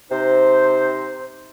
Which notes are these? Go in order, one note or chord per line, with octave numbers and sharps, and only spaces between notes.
C3 D#4 C5